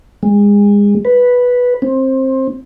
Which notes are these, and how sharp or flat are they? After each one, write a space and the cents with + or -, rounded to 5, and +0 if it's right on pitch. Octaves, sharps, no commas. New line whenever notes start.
G#3 -30
B4 -5
C4 +20